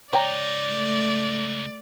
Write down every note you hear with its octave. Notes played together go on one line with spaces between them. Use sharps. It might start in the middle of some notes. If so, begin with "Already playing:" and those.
C#2 D#4 C#5 D5 G5 A#5
A3